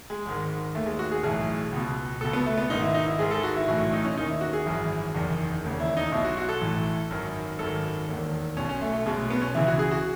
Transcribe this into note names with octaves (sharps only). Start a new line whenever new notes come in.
G#3
G#1 G#2 D#3
D#2 D#3 A3
G#3
F#4
G#4
B1 A2 E3 G#4
C#2 B2
C#2 B2 A4
B3
A3
B3
G#1 G#2 D#3 D#4
E4
D#4
E4
G#1 G#2 D#3 G#4
A4
F#4
E4
B1 A2 E3 F#4
E4
D#4
C#4
D#2 D#3 D#4
E4
F#4
G#4
G#1 F#2 E3
F#1 E2 D#3
E1 D#2 C#3
E4
D#4
B1 B2 E4
F#4
F#4
A4
A1 A2 E3
G#1 F#2 D#3
G#1 F#2 D#3 A4
E1 D#2 D#3
B1 B2 C#4
C#4
A3
A3
B1 B2 G#3
B3
C#4
C#2 C#3 E3 E4
F#4
G#4
F#4